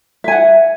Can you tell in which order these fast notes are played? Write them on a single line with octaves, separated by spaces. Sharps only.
E5 G#5 F#5